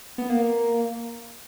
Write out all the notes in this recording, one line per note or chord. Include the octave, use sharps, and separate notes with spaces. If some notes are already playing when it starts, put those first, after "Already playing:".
B3
A#3